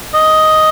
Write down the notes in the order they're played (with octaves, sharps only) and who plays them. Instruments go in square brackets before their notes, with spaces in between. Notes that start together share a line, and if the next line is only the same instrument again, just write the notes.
[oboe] D#5